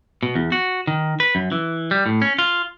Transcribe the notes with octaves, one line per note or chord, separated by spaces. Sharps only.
B2
E2
F#4
D#3
B4
F#2
E3
G3
A2
C#4
F4